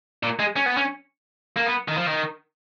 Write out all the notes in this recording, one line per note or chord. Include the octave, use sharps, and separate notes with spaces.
A#2
G#3
C#4
B3
C#4
A#3
B3
D#3
F3
D#3